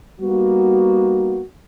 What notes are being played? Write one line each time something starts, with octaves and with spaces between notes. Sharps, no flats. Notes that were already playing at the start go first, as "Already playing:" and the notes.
G3 A#3 B3 D#4 F#4